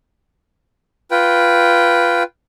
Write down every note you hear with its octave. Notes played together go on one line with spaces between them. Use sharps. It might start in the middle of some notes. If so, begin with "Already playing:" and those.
F4 B4 G5